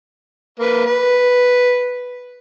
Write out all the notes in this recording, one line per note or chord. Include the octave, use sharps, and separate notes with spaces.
A#3 B4
B4